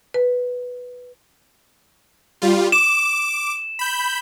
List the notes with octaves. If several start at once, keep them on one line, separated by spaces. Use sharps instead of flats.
B4
G3 F4
D6 E7
B5 G6